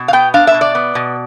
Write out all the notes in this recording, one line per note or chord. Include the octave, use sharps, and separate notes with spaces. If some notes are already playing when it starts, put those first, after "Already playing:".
Already playing: B2
F5
B3 G5
D4 F5
E5
B2
D5
B3
B2